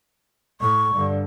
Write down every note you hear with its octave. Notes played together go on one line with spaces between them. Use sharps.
A2 C#6
G2 D3